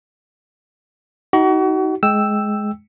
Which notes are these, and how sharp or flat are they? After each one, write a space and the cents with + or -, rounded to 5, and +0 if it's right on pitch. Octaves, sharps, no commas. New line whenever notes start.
D#4 +25 F#4 +35
G#3 +15 G5 +0 E6 +0